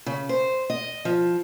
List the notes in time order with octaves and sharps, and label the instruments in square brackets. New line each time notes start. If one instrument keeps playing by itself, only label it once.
[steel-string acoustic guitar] C#3
C5
D#5
F3